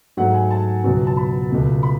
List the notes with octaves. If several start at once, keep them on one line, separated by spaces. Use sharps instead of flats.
G#2 F#3 A3 F#5
G#5
A5
C#2 B2 F#3 B3
A5
B5
C#2 B2 A3
B5